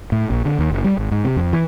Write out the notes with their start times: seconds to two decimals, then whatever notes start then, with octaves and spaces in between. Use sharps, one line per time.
0.12 A2
0.30 A#1
0.45 D3
0.59 D#2
0.70 F#1
0.84 G3
0.98 G#1
1.11 G#2
1.25 C3
1.36 F2
1.53 E3